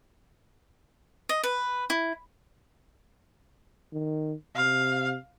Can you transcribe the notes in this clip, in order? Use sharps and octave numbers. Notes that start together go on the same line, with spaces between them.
D#5
B4
E4
D#3
C3 F5